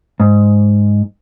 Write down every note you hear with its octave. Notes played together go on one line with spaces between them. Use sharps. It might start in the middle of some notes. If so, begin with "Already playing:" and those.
G#2